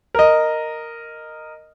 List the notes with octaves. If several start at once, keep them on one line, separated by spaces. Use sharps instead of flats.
A#4 D#5